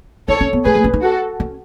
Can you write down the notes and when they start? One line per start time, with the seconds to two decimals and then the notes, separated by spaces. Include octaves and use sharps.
0.28 D#4 A4 C#5
0.41 C#4
0.53 B3
0.65 A3 G#4 B4
0.75 A3
0.84 C#4
0.94 D#4
1.02 F#4 A4
1.40 C#4